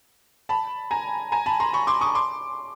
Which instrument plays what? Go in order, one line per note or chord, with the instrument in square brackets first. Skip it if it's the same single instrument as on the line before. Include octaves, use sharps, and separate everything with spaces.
[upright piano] A5 B5
G#5 A#5
G#5 A#5
A5 B5
A#5 C6
B5 C#6
C6 D6
C#6 D#6
C6 D6